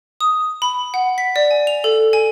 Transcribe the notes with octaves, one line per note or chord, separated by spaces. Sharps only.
D#6
B5
F#5
B6
D5
G#5
F7
A4
G#5